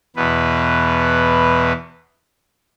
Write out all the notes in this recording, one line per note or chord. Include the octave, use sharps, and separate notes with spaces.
E2 B2 B4